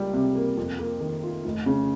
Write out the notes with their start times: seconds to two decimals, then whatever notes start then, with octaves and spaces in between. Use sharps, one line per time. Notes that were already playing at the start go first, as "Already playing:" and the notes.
Already playing: C#2 G3 A#3
0.13 C3
0.35 A#3
0.57 F2
0.79 A#3
1.00 D#3
1.23 F4
1.45 F1
1.66 C#3